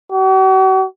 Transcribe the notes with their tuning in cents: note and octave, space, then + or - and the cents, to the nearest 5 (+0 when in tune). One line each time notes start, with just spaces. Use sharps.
F#4 +45